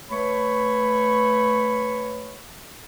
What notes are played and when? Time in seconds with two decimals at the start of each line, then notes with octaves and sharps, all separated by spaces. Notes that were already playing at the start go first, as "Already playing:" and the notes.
0.11 A3 B4 C#5 B5 C#6